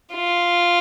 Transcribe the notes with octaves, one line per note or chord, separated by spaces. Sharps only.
F4